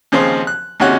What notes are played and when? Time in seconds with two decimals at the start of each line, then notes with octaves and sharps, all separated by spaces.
0.12 D#2 C#3 F3 C4 C5
0.47 F#6
0.80 D#2 G#2 C3 C#4 F#4 F#6